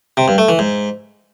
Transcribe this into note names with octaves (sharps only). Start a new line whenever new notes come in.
C3
G2
A3
E3
G#2